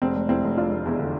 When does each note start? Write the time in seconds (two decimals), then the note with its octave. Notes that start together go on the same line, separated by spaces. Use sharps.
0.02 F1 C4
0.16 F1
0.29 F1 C4 E4
0.44 F1
0.57 F1 D4 F4
0.71 F1
0.85 E2 E4 G#4
0.99 D3